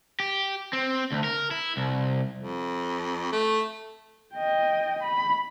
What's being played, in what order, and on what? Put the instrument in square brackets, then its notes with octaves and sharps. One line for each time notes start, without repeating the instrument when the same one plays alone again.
[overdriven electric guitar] G4
C4
D2
A#4
E4
C2
[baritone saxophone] F2
A3
[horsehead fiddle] D#5 G5
B5